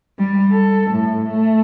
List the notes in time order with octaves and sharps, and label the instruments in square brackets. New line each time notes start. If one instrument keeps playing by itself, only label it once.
[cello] G3
A4
A2
A3